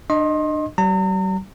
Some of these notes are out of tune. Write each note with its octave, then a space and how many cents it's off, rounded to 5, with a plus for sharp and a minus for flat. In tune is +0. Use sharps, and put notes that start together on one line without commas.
D4 +40 D#5 +0 C6 +30
G3 -45 A#5 -40